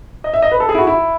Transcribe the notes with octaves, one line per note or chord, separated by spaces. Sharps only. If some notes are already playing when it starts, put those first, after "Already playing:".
D#5
E5
D#5
B4
A4
G#4
E4
F#4
E4